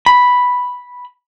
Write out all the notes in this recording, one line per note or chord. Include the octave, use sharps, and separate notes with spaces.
B5